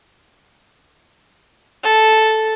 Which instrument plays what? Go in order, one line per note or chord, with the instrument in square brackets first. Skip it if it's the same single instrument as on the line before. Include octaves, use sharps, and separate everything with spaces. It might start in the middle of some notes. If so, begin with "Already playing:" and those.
[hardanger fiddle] A4